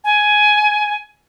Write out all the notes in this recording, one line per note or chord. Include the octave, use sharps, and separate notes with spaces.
G#5